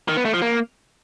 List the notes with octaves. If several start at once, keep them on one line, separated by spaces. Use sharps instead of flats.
D#3
B3
A3
F3
A#3